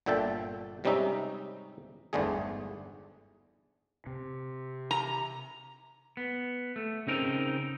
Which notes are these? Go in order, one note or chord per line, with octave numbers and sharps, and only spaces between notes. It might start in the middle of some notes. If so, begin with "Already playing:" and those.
G1 A#2 D3 E5 G5 A5
G#2 C3 G3 C#4 D#4 E5
G1 E2 G#2 D3 A3 G#4
C3
A#5
B3
A3
C#3 C4 D#4 A#4